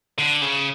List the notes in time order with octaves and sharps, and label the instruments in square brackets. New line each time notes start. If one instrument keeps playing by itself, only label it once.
[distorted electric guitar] D3
C#3